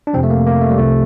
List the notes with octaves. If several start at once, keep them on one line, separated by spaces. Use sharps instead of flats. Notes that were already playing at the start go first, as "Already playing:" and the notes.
D4
F2 C3 F3 C4
A3
A#3
A#3
A3
G3
C2 C3 F3 A3